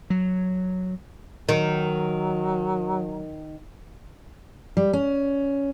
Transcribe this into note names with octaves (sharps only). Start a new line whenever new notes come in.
F#3
D#3 F#3
G3
C#4